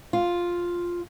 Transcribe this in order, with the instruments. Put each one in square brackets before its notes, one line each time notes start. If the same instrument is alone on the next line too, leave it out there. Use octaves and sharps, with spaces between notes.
[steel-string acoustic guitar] F4